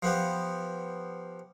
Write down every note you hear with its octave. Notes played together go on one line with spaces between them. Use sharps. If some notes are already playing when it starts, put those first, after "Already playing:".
F3 B3 G4